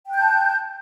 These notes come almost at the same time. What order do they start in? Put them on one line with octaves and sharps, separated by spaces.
G5 F#6 G6 A5